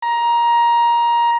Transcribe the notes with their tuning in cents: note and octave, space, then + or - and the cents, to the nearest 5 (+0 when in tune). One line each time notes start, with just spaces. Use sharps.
A#5 +15